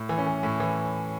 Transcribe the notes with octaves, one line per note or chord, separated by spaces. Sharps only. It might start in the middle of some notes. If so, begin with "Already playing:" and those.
Already playing: A2
E3
C#4
E3
A2
E3